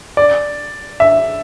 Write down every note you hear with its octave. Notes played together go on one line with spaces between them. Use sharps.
D5
E5